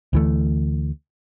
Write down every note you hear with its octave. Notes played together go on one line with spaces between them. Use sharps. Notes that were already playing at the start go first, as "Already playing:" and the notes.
D2 E3 A3